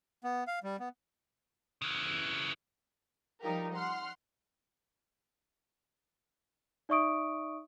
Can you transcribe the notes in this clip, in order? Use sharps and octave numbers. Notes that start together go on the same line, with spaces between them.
B3
F5
G3
B3
C#3 E3
F3 G3 D#4 F4 G4 A#4
F#5 C6 F6
D#4 D5 E5 C#6 D#6 D7